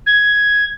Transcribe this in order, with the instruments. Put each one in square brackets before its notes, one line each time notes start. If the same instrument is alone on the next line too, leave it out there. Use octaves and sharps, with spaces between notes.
[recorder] G#6